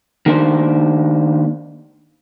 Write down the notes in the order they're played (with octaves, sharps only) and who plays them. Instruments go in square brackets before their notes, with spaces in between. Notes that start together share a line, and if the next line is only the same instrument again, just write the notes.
[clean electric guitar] D#3 A#3 D4 C5